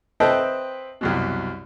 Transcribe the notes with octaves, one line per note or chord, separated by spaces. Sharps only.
C4 B4 D#5 E5 G5 A5
C2 F#2 B2